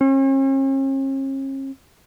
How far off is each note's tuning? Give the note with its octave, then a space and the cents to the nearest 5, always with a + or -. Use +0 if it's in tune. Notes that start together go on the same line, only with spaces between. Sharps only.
C#4 -45